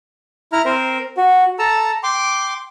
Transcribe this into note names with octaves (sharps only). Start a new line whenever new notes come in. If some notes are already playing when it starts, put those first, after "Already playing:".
E4 A#5 F6
C4 A#4 C5
F#4
A4 A5 A#5 E6
G5 C6 D6